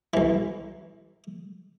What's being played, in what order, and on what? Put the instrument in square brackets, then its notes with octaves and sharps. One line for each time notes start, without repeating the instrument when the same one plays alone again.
[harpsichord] B1 E3